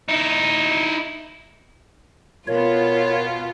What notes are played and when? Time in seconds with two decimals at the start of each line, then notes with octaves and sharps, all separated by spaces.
0.08 D#4 E4
2.48 B2 B3 F4 A#4 C#5